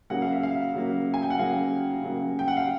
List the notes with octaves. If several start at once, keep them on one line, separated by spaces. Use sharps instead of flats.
C#3 F#3 A#3 F#5
F5
E5
F5
C#3 F#3 A#3
G#5
G5
F#5
C#3 F#3 A#3 F5
C#3 F#3 A#3
G5
F#5
F5